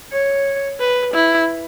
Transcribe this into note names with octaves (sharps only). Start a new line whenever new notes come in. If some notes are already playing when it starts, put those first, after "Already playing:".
C#5
B4
E4